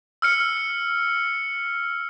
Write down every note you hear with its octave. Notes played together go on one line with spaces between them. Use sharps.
E6 F6 C#7